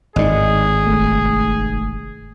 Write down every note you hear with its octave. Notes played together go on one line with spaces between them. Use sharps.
G#1 A2 D#4 G#4 D5 D#5
F1 A3